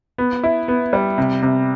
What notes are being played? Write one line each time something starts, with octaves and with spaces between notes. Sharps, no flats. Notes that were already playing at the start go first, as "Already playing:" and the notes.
B3
E4
B3
G3
C3
C3